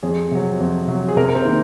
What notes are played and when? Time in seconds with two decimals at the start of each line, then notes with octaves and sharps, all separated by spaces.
0.03 F2 G#4
0.31 C3 F#3
0.60 F2
0.88 C3 F#3
1.09 G#4
1.17 C3 A#4
1.29 A#4
1.35 C4 C5
1.45 D#3 A#3